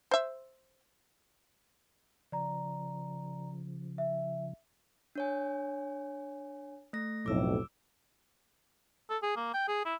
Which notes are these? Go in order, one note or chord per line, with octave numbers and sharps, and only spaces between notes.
C5 E5
C#3 F3 D5 A#5
E5
D4 C#5 G#5
A3 A#6
B1 F2 A2 D6 E6
A4
G#4
A#3
G5
G#4
E4